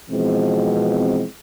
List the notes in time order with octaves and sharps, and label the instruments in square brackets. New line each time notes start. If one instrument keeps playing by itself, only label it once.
[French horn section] B2 E3 F3 G#3 C4